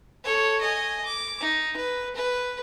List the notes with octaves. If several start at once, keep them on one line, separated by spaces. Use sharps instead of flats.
A4 C#5
D#5 G#5
D6
D#4
B4
B4